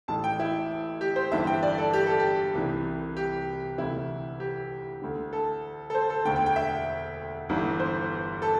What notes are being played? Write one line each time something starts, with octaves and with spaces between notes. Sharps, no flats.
A1 A2 E3 A5
G5
E4
G4
C5
G1 G2 E3 E5
G5
D5
A4
G4
A4
G4
C2 C3 E3
G4
D2 C3 E3 E4
G4
D2 D3
A4
A4
C5
A4
E1 D2 D3 G5
G5
G5
E5
G1 G2 E3
C5
A4